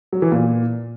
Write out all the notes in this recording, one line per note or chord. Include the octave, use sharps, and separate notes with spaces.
F#3
E3
A#2